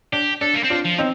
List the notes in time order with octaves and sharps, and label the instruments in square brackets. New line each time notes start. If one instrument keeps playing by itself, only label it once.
[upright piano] D4 [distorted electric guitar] G4
[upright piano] D4 [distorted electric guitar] A4
[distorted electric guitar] A#3
C4
[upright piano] D4 F4
[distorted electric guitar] F3
[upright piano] C4 D#4